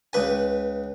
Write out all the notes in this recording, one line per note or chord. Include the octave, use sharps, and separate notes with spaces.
C#2 B4 G#5